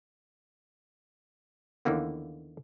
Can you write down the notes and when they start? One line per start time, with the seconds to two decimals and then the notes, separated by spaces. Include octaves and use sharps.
1.85 D#2 D3 E3 A#3 B3